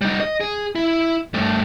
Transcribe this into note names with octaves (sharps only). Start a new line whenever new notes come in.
G3 D#4
D#5
G#4
E4
G2 A3